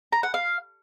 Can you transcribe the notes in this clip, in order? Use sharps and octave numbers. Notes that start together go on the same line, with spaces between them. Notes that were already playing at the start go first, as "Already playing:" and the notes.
A#5
F#5
F5